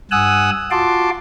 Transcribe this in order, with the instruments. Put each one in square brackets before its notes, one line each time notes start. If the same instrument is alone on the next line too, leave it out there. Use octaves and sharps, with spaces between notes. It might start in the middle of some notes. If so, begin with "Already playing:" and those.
[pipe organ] G2 F#5 G#5 D#6 E6 F#6
F4 F#4 A5 C6 D6